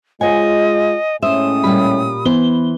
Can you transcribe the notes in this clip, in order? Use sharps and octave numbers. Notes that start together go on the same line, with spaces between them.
G#3 F4 C5 C#5 D#5 F#5 G#5
A2 G#3 C#4 C5 E5 D#6
A#2 G3 G4 B5
E3 B3 C5 G7